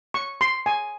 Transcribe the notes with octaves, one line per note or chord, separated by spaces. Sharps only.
C#6
C6
G#5